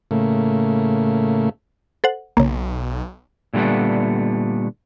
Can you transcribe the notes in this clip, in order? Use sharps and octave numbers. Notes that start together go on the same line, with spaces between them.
A2 C#3 A3 A#3
A4 C5 F#5
B1 C#3 A#3
A#2 D3 G3 A3 B3